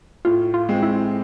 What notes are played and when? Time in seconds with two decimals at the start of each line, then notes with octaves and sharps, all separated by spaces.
0.25 A2 F4
0.54 F4
0.69 G#3 C4
0.83 E4